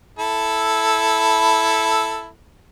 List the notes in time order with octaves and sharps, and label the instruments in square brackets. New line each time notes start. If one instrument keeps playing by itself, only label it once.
[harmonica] E4 A4